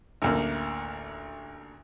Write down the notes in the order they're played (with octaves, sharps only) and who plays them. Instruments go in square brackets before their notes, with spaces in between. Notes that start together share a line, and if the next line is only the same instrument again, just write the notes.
[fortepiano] A1 D2 A#3